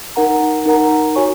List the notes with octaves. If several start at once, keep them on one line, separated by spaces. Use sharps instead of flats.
D#4 A#4 F#5 A#5
D#4 A#4 F#5 A#5
F#4 C#5 G#5 C#6